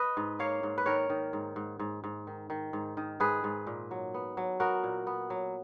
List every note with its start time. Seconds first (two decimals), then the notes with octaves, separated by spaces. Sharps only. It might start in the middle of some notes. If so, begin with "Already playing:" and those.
Already playing: B4 D#5
0.17 G#2
0.39 A#3 C#5 F5
0.63 G#2
0.78 B4
0.86 D#3 A#4 C#5
1.10 D#3
1.33 G#2
1.56 G#2
1.79 G#2
2.04 G#2
2.27 D#3
2.50 D#3
2.73 G#2
2.97 D#3
3.20 G#2 G#4 B4
3.44 G#2
3.67 A#2
3.91 F#3
4.14 B3
4.37 F#3
4.60 B3 F#4 A#4
4.84 A#2
5.07 B3
5.30 F#3